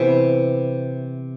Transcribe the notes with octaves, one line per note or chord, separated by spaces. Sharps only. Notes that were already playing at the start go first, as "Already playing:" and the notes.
Already playing: C3 E3 B3 C5 E5